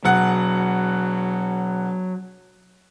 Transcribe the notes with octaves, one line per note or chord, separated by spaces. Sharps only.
E1 F#3 F#5